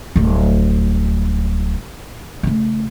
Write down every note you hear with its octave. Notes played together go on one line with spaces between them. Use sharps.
D1 G3
C#3 A3